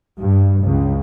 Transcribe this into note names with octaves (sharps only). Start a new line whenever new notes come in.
G2
C#2